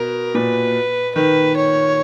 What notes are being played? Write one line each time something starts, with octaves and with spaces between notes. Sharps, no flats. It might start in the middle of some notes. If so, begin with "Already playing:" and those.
Already playing: B2 A#4
A#2 B4
D#3 B4
C#5